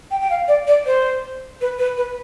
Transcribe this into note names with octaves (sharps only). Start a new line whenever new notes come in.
G5
G5
F5
D5
D5
C5
B4
B4
B4